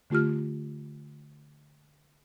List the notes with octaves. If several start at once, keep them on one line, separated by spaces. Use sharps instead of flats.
D3 A3 F4 G4 F6